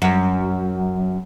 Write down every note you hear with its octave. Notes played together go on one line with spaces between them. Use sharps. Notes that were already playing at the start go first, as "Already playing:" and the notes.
F#2